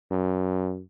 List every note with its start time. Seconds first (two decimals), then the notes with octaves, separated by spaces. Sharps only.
0.11 F#2